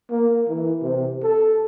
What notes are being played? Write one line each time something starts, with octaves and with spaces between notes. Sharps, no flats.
A#3
E3
C3
A4